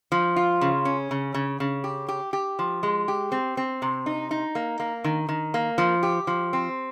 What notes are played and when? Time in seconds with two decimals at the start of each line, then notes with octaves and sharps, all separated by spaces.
0.12 F3
0.36 F4
0.61 C#3
0.85 C#4
1.11 C#3
1.34 C#3
1.60 C#3
1.84 G4
2.08 G4
2.33 G4
2.59 F3
2.83 G#3
3.08 G4
3.32 C4
3.57 C4
3.82 C3
4.06 D#4
4.31 D#4
4.55 A#3
4.80 A#3
5.04 D#3
5.29 D#3
5.54 A#3
5.78 F3
6.03 G4
6.27 F3
6.53 C4